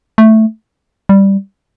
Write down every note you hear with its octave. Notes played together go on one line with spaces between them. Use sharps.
A3
G3